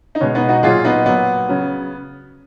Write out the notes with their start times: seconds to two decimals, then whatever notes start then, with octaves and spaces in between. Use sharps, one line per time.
0.15 D#4
0.20 B2 G#3 C#4
0.35 B3 D#4
0.49 D#4 F#4
0.63 A#2 F#3 F4 G#4
0.84 B3 D#4
1.05 A#2 F#3 B3
1.48 C#3 F#3